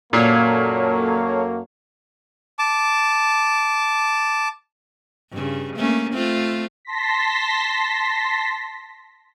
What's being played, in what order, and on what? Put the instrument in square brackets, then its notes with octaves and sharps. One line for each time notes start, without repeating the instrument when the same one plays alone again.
[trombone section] F#2 F#3 A#3 [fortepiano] A#2 [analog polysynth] A4 C#5 F5
[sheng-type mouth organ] A5 D6
[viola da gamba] G2 C#3
A3 A#3 C#4
A3 C4 F4
[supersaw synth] A5 C6 A#6 B6